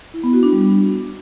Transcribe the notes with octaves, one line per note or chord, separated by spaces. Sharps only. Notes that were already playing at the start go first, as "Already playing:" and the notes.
E4
B3
F#4
D4
G3